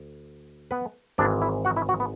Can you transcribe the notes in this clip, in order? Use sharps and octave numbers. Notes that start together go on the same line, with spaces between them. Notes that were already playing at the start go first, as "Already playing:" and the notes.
Already playing: D2
B3 B4
G#1 G#2 E3 D4 D5
E4 E5
F#4 F#5
E4 E5
F#4 F#5
B3